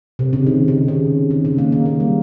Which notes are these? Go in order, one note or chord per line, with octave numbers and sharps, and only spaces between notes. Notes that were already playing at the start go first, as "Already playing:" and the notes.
C3
C#3
D#3
C#3
C#3
D#3
C#3
A#3
A#3
A#3
G3